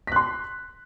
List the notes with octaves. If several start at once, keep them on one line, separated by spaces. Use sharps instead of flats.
C6 F#6 B6